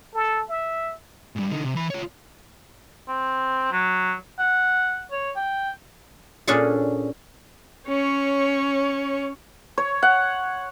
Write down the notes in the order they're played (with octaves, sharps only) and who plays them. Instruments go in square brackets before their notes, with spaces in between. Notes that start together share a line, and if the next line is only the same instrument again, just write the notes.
[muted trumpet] A4
E5
[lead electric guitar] G#2 G3
D3 D#4
C3
E3 B5
F4 C#5
[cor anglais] C4
F#3
F#5
C#5
G5
[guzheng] A#2 C#4 D4 G#4 A4
[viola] C#4 C#5
[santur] C#5
F#5